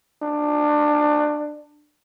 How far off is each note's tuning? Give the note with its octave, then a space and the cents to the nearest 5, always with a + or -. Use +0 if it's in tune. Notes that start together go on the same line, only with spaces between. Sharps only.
D4 +20